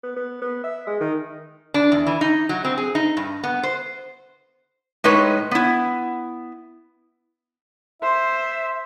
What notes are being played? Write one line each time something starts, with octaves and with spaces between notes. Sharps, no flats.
B3
B3
B3
E5
G#3
D#3
D4
E2
E3
D#4
F#3
C4
G#4
D#4
G2
B3
C5
A2 G#3 D#4 B4 C#5
B3 E4
C5 E5